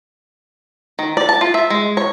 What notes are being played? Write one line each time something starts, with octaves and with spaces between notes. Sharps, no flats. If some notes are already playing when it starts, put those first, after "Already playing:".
D#3
D5
A5
F4
E5
G#3
C#5